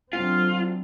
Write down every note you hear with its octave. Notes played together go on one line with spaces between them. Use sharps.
D3 F#3 C4 F4